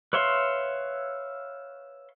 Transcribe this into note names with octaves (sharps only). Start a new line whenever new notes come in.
B4 C#5 E5 F5 C6